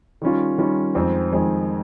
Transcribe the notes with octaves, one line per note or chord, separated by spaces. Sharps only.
D#3 G3 C#4 F4
D#3 G3 C#4 F4
F2 D#3 G#3 C4
F2 D#3 G#3 C4